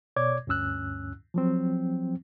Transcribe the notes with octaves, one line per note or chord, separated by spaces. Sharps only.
B2 C#5 D5 D6 G#6
D2 G2 C#4 E6 F#6
F3 F#3 C4